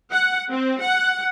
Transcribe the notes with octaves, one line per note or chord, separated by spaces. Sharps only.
F#5
C4
F#5